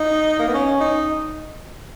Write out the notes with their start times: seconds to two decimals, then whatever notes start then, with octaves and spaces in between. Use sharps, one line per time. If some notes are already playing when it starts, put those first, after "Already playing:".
Already playing: D#4
0.40 A#3
0.48 B3
0.54 C#4
0.81 D#4